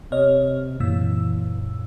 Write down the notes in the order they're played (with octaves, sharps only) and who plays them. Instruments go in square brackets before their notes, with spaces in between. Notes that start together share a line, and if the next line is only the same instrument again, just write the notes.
[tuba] C3 [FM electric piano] C#5 D#5 F6
[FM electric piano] F#2 A#2 E6 [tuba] E3